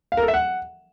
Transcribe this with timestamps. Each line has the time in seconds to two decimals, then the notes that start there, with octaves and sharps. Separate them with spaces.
0.12 F5
0.17 A#4
0.23 A4
0.28 E5
0.34 F#5